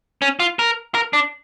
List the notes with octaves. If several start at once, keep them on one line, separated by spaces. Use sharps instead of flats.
C#4
F4
A#4
A#4
D4